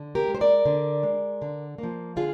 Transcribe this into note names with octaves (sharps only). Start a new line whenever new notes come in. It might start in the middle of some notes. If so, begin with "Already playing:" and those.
Already playing: D3
G4 A#4
G#3
C5
A#4 D5
D3
G#3
D3
F3 A#3
D3 F4 G#4